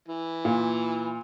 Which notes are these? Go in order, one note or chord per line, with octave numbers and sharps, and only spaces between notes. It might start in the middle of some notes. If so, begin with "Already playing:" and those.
E3
A#2